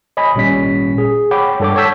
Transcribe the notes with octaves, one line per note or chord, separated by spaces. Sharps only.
C#5 D#5 G#5 B5
G#1 A#2 G3 C#4 B6
G#4
C#5 F#5 G5 B5 D6
G2 D4 A4 C#5 G5 D6
C#5 F#5 A5 E6 G6 B6